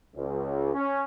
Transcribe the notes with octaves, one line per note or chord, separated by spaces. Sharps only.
C#2
C#4